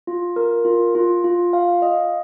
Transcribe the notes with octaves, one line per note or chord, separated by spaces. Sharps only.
F4
A#4
F4
F4
F4
F5
D#5